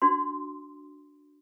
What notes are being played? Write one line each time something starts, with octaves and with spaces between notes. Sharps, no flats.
D4 F#4 C6